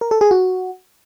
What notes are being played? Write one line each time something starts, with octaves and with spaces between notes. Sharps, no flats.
A#4
A4
G#4
F#4